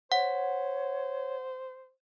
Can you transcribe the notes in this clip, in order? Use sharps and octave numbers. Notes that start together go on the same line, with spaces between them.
C5 C#5 F#5